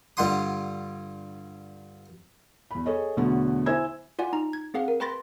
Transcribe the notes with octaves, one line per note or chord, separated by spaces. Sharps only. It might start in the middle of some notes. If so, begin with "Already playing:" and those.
G2 D3 F4 F#5 C6 D#6
E2 B5
G#4 A4 C#5 D#5
E2 B2 D3 F#3 A3 B3
E4 C5 G#5 E6 G#6
F4 D5 F#5 G#5
D#4 A#5
G#6
C4 G#4 F5 F#5
A#4
B4 G5 B5 C6 A6 A#6